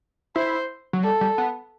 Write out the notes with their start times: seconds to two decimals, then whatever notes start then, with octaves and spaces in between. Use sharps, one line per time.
0.36 E4 C5
0.93 F#3
1.03 G3 A4
1.21 G3
1.38 B3